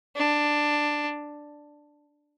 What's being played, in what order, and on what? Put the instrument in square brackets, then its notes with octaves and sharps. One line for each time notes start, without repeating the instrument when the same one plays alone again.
[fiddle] D4